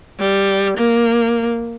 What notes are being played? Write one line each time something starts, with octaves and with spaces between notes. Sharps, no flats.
G3
A#3